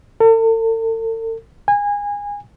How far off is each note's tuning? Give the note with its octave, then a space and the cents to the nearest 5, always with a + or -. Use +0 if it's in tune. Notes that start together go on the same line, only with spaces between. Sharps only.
A4 +45
G#5 -25